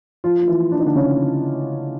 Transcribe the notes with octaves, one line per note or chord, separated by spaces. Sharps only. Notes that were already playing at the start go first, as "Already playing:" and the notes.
F3 F4
F4
E3 E4
D4
D#4
D3 D4
C#3 C#4